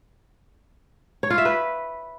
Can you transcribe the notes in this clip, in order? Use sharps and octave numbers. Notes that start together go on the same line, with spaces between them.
C#5
F4
E5
B4